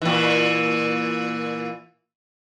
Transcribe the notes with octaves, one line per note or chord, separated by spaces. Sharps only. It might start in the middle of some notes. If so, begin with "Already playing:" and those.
A#2 E3